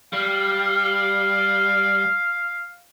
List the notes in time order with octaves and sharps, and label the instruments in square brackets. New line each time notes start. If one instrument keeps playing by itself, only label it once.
[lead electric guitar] G3 [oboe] F5